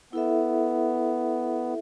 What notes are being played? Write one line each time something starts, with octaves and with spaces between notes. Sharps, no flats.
B3 E4 A4 E5